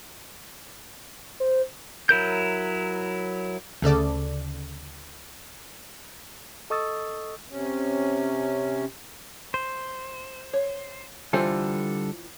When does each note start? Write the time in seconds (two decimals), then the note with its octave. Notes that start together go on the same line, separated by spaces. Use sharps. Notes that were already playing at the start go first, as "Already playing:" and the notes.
1.40 C5
2.09 F#3 E4 A#4 G6
3.82 D2 C#3 A4 D5
6.70 A4 D#5 C#6 D#6 E6 A6
7.50 C3 C#4
9.54 C5
10.53 C#5
11.33 D3 E3 G3 F4 A4 C5